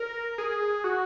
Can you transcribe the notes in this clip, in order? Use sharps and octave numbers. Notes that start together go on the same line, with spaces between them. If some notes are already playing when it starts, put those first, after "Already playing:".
Already playing: A#4
G#4
F#4